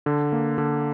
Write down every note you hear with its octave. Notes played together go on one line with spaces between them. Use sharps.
D3
A#3
D3